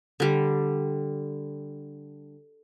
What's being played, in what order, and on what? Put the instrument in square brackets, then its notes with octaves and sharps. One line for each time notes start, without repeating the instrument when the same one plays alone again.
[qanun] D3 G3